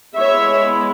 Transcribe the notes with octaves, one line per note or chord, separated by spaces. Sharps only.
G#3 B3 E4 C#5 E5